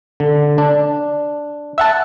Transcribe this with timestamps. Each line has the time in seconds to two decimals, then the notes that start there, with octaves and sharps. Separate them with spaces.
0.20 D3
0.58 D4
1.78 E5 F#5 A5